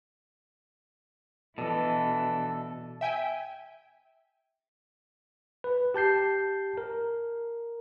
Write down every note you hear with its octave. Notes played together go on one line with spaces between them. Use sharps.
B2 E3 D4 A4
E5 G5 G#5
B4
G4 A5 G6 C7
A#4